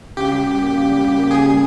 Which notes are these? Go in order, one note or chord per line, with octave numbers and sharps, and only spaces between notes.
C#3 G4
G3
C#3
A#3
C#3
G3
C#3
A#3
C#3 G#4
G3